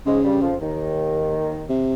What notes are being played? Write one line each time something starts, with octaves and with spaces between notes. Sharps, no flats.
G#2 C#3 G#3
G2 G3
F2 F3
D#2 D#3
C3